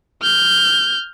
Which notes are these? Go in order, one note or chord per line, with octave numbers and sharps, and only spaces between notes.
F6 G6